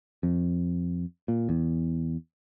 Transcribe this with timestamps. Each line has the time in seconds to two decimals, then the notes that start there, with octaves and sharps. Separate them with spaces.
0.23 F2
1.28 A#2
1.49 E2